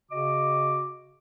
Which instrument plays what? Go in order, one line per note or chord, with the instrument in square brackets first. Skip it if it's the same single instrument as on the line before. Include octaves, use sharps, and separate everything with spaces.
[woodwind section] C#3 F#4 D#5 D6